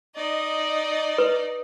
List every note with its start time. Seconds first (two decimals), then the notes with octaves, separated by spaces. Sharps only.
0.15 D#4 D5 D#5
1.18 B4